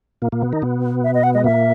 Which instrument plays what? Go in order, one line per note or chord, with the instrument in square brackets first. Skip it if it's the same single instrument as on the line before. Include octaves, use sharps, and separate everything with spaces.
[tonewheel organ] A#2 A#3
A#2 A#3
B2 B3
D#3 D#4
B2 B3
[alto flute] E5
D#5
F#5
[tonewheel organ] G#3 [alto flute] D#5
[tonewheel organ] A#2 A#3 [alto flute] E5